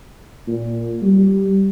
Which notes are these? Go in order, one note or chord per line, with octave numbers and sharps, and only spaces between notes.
A#2
G3